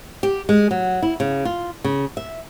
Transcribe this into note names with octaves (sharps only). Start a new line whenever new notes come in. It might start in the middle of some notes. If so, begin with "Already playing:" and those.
G4
G#3
F#3
E4
C#3
F4
C#3
E5